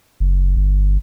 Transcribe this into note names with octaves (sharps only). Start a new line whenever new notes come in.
F#1
G1